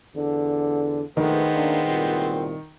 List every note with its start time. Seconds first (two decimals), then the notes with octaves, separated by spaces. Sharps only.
0.15 E2 D3
1.17 A#1 D#3 G#3 A3 B3 C4 B4
1.54 A#3 D4
1.87 C2 A#2